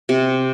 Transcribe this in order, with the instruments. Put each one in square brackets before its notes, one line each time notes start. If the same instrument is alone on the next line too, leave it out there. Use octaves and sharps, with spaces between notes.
[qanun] C3